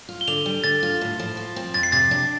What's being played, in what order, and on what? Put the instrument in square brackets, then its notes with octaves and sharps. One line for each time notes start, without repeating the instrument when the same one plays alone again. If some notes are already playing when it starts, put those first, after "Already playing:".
[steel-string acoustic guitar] F4
[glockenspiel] G7
[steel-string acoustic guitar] D3 [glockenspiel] F7
[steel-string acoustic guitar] G3
[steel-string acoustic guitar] D3 [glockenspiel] A6
[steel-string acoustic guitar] F4
A2
F3
F4
C4
[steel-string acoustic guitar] F2 [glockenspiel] A6
[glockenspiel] C7
[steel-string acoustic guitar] C3 [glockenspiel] A6
[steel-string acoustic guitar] D4